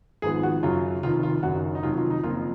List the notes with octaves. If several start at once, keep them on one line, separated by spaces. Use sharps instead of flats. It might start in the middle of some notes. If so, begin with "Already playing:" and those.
G#1 G#2 F3 B3 G#4
F#4
F#2 C#3 F#3 F4
F1 F2 D#3 F4
F4
F#1 F#2 D#3 F#4
D#4
F1 F2 D#3 F#3 F4
F4
D#4
F#1 F2 F3 A#3 F4